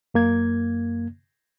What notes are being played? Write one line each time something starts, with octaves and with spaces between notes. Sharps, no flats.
F#2 A#3 G#6